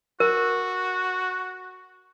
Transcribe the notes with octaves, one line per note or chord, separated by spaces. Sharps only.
F#4 A#4